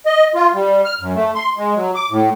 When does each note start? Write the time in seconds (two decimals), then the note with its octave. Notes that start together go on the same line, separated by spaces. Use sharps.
0.06 D#5
0.35 F4
0.54 G3
0.85 F6
1.00 F#2
1.15 A3
1.35 C6
1.57 G#3
1.76 F#3
1.95 D6
2.11 A2